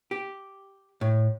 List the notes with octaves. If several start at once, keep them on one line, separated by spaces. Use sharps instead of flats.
G4
A2